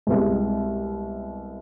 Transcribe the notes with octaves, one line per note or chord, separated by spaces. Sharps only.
C2 B2 G#3